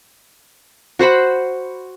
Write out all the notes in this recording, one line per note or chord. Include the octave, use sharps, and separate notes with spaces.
F#4 C5 F#5 B5